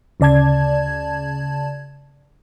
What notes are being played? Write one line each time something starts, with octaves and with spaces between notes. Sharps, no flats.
D2 C#3 D5 A5 G#6